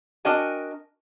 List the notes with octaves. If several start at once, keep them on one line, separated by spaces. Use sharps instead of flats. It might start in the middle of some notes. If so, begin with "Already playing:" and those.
D4 F#4 A#4 D#5 G5 G#5